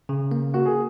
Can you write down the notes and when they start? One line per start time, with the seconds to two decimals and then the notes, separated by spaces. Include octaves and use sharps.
0.09 C#3
0.31 A#3
0.54 A#3 F#4
0.65 G#4